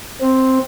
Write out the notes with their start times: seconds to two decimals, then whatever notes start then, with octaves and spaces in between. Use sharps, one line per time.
0.21 C4